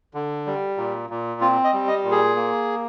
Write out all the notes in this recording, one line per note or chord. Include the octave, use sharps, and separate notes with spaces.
D3
G3
A#2
A#2
C4 F4
D#5
G3
D#5
A#2
G#4
A#3